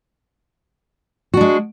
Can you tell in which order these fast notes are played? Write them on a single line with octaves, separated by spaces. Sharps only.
F#4 D4 G#3